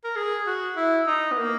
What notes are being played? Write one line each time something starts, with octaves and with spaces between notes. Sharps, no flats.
A#4
G#4
F#4
E4
D#4
B3
A#3